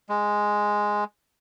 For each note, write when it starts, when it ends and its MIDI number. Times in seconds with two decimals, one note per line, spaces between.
0.09 1.04 56